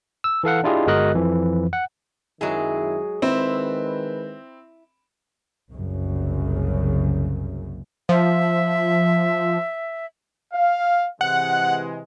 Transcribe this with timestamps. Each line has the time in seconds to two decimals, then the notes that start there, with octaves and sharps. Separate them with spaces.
0.24 E6
0.43 E3 A4 F5 F#5
0.64 D4 E4 F4 G4 G#4 D#5
0.87 G1 G#3 F#4 A#4 D#5 F#6
1.14 F2 E3 F3
1.73 F#5
2.41 F#2 D#3 F#3 G#3 E4 G#4
3.22 D#3 G#3 C4 E4 B4
5.73 F#1 C2 F#2 C#3
8.09 F3 E5
10.54 F5
11.21 C3 E3 G#3 F#5